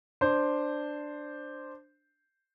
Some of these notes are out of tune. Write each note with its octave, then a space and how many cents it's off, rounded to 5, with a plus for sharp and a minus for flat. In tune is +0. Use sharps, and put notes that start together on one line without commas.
D4 +5 C5 +0